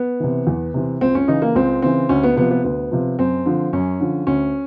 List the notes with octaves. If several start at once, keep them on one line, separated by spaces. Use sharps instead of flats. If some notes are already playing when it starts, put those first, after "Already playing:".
Already playing: B3
C3 E3
E2
C3 E3
C#2 C4
C#4
C#3 E3 D#4
A#3
C#2 C4
C#3 E3 C4
D2 C#4
B3
C3 F3 B3
B3
D2 B3
C3 F3
F#2 C4
D3 F3
F#2 C#4
D3 F3
D2 C#4